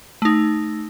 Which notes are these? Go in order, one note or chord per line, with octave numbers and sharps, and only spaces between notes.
A3 D#4